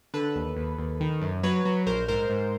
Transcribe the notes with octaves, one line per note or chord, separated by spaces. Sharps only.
D3 A4 B4
D#2
D#2
D#2
D#3
F#2
F#3 B4 C#5
F#3
A#1 A#4 C5
G#2 A#4 C5
G#2